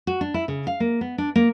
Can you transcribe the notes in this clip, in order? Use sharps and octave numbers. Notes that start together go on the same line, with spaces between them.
F#4
D4
E4
C#3
F5
A#3
B3
D4
A#3